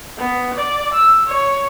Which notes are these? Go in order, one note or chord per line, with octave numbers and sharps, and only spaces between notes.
B3
D5
E6
C#5